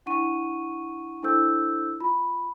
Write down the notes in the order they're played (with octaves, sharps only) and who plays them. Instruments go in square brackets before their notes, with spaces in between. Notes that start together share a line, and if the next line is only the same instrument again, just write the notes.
[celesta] D4 E4 F#5 C#6 D#7
D4 E4 A4 C5 E6 G6
F4 B5